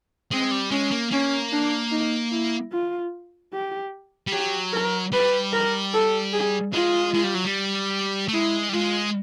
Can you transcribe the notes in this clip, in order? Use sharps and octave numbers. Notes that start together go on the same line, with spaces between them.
G#3 C4
G3
G#3 C#4
A#3
A#3 C#4
D4
D#4
E4
F4
G4
G3
F#3 G4
A#4
G3 B4
A#4
A4
G#4
G#3 F4
G#3
G3
F#3
G3
A3
G#3 E4
G3
G#3 F4